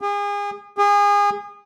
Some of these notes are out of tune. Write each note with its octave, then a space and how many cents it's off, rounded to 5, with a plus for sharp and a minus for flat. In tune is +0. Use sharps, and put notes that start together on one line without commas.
G#4 -35
G#4 -30